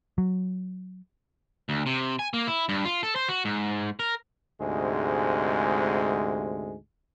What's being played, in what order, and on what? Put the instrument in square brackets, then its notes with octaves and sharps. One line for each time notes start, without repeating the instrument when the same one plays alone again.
[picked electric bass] F#3
[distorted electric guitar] D2
C3
G#5
A#3
E4
G2
F4
A4
C5
F#4
G#2
A#4
[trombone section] D2 G#2 C3 G#3